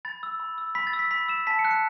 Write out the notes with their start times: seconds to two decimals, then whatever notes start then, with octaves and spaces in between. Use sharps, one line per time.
0.05 B5 A6
0.23 E6
0.40 B5
0.58 E6
0.75 B5 B6
0.87 A6
0.93 E6
0.99 B6
1.11 B5 B6
1.28 E6 E7
1.47 A5 B6
1.59 C#7
1.65 F#6
1.71 C#7